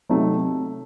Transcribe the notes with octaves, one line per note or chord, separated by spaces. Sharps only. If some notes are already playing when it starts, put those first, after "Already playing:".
C3 F#3 A3 D#4